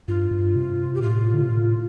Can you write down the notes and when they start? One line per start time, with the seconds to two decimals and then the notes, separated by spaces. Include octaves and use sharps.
0.08 G2 F4
0.31 G2
0.56 C3
0.95 G4
1.02 A2 F4
1.34 D3
1.42 C3
1.50 A2